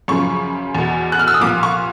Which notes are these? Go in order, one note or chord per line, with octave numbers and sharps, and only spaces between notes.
F#2 C#3 F3 C#6
E2 B2
F#6
F6
E6
D#6
C2 A#2 F3 D6
C#6